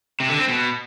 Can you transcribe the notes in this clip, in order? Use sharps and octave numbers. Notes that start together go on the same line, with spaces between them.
C3
D3
C4
B2